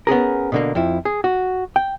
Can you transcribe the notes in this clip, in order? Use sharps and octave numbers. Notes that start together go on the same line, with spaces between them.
B3 C#4 G#4 A#4
B2 D3 A#3
F2 F3 E4
G#4
F#4
G5